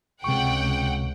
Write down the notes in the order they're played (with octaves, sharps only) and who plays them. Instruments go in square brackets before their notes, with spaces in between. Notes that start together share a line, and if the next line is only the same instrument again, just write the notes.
[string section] C#2 F#5 G5 [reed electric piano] C3 C#6